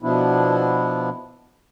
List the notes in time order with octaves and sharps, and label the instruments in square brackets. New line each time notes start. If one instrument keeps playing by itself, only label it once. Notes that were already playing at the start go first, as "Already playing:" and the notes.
[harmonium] B2 F3 B3 D4 E4